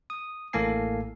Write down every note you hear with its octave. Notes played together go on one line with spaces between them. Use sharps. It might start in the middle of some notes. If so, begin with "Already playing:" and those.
D#6
A1 A2 A#3 A4 G#5 C7